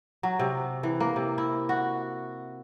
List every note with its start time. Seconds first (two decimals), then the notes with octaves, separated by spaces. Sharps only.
0.23 F#3
0.39 C3
0.83 E3
1.00 A#3
1.16 C3
1.38 E4
1.69 F#4